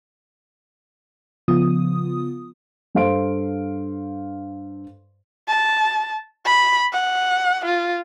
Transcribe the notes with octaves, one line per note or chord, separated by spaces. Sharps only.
C#3 F3 B3 F4 D#6
G2 A4 C5 F5 C6 D7
A5
B5
F#5
F4